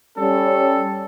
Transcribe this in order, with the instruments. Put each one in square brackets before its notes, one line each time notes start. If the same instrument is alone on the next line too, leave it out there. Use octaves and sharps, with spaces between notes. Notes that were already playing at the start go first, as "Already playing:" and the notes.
[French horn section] G3 C#4 [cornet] A4